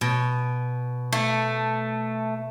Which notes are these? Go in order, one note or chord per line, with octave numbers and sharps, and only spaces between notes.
B2
A3